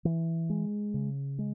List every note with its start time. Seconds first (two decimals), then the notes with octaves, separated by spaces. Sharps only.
0.05 E3
0.50 G#3
0.94 C#3
1.39 G#3